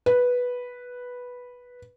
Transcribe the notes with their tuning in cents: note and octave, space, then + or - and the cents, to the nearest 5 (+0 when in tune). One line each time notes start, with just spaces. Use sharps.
B4 -5